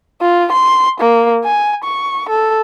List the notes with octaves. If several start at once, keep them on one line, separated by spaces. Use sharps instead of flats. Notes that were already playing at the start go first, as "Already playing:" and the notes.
F4
C6
A#3
G#5
C#6
A4